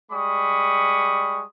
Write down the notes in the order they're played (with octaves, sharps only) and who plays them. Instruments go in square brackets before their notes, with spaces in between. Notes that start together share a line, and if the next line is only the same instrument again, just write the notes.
[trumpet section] G3 G#3 B5 C#6 D#6